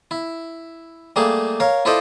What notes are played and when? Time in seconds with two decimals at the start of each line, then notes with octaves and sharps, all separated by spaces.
0.11 E4
1.16 G3 A3 A#3 G#4
1.60 A#4 C#5 F5
1.85 E4 F4 A4 C5 D5 D#5